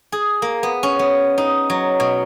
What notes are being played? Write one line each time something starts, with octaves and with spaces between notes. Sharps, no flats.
G#4
A#3
B3
C#4
B3
D#4
F#3
B2